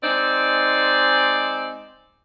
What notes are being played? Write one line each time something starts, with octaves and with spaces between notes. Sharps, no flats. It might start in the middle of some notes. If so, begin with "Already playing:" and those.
G#3 C4 D#4 D5